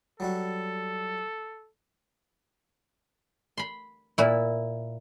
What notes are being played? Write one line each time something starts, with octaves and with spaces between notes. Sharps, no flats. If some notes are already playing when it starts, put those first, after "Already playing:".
F#3 G3 F#4 A4
B5 C6
A#2 E4